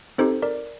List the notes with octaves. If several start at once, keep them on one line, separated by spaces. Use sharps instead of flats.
C4 D#4 G4 A4 C5
A#4 D5